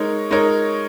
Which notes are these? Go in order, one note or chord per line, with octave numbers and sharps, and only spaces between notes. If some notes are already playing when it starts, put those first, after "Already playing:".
Already playing: G#3 D#4 A#4 C#5
G#3 D#4 A#4 C#5